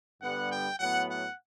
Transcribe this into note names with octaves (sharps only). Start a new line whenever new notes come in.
G2 D3 G3 B3 F#5
G5
A2 F#3 B3 F#5
F#5